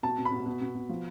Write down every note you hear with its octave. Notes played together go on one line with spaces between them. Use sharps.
B2 A5
B2
B5
B2
B2
B2
B2
F3